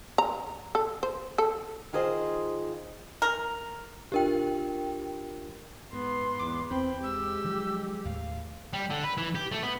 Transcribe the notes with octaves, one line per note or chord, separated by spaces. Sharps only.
A#5
A4
C5
A4
D#3 F4 G#4 C5 D#5
A#4
C2 D4 F4 G4 A#4 G5
G#2 B3 C6
E2 D6
E2 C4 G5 B5
G#3 G4 E6
D#3 F3 F#3
D#2 A2 F5
G3
D3
B4
E3
G4
A3
B3